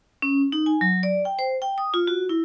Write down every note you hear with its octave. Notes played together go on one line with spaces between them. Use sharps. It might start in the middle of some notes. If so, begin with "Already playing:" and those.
C#4
D#4
G#5
F#3
D5
G5
C5
G5
D#6
F4
F#4
E4